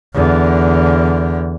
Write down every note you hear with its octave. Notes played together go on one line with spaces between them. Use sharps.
E2 D3